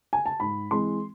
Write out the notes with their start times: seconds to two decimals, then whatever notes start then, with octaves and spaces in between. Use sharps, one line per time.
0.13 G#5
0.26 A5
0.40 G#2 B5
0.71 E3 G#3 C4 C6